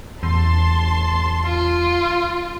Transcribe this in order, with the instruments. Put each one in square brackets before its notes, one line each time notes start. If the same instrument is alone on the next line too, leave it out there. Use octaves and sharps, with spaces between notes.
[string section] A1 A5 C6 [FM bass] E2
[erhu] F4